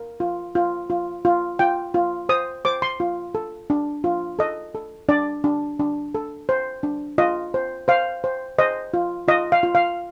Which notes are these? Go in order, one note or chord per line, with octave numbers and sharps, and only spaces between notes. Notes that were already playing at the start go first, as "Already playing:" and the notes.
Already playing: A#4
F4
F4
F4
F4
F4 G5
F4
C5 D#6
C5 D6
C6
F4
A4
D4
F4
A4 D#5
A4
D4 D5
D4
D4
A4
C5
D4
F4 D#5
C5
C5 F5
C5
C5 D#5
F4
F4 D#5
F5
F4
F5